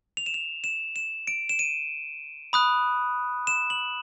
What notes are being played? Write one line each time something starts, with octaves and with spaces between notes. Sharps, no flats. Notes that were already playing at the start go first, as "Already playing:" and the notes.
F7
E7
F7
E7
E7
D7
E7
D#7
B5 D#6 F#6
E7
F#7